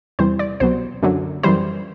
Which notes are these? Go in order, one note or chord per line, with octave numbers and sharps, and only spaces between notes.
E2 C3 E3 G3 C5
D5
C2 B2 F#3 C5
F#2 D3 F#3
F#2 E3 G3 C5